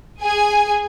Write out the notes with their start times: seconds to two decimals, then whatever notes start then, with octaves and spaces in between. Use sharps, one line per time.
0.22 G#4 G#5